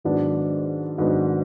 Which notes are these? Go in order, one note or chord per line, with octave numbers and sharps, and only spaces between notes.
G#2 D#3 F#3 B3 D4
G#2 D#3 F#3 B3 D4